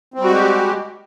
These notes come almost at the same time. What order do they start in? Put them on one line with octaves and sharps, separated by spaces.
C4 G3 F#4 G#3 G4